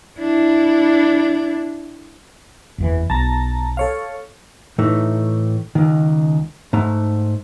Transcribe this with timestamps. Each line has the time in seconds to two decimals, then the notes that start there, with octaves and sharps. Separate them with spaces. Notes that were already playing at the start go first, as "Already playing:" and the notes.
0.19 D4 E4
2.78 F#1 E2 E3
3.10 B1 A5 A#5
3.77 A4 C#5 F5
4.78 A2 E3 A3 D#4
5.75 C#2 D#3
6.73 G#2 A3 A#5